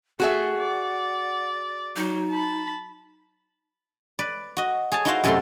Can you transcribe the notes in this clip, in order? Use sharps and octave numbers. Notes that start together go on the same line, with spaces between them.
A3 F#4 G#4 E5 F#5
D5
F#3 D#4
A5 B5
B4 D5
F#4 D#5
G#4 C#5 G#5 A5
D#4 E4 F#4 A#4 C5 F5
F#2 C3 F#3 A3 A4 C6